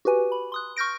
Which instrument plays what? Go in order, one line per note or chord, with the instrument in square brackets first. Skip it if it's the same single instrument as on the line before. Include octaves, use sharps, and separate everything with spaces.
[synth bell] F#4 G4 B4 G#5
B5
C6 D#6 F#6
C#6 F6 G6 A#6 D7